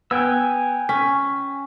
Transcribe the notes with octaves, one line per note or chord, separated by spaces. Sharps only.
B3 G5 G#5 E6
C#4 B6